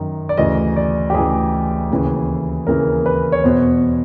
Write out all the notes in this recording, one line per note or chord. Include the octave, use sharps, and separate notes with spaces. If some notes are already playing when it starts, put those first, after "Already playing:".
Already playing: F#2 D#3
D5
D2 C#3 E3 D#5
D5
G4
D2 C#3 E3 G#4
D#2 C#3 E3
D#2 C#3 E3 A#4
B4
C#5
E2 B2 C5